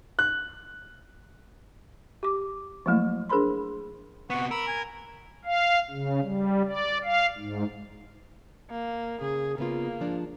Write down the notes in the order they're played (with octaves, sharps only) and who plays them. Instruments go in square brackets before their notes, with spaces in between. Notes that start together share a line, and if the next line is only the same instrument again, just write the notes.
[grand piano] F#6
[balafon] G4 D6
F3 F#3 A3 A#3 E4
D4 G#4 A#4 C5 B5 C6
[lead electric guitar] C3 B3 [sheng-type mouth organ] F#5 C#6
[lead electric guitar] A#4 [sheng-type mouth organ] B5 E6
[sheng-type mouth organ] G#5
[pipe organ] F5
C#3
G3
D5
F5
G#2
[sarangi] A#3
[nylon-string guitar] C#3 [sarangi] G#4
[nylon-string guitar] C#3 B3 F4 [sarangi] A#3
[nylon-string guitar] G#2 F3 D4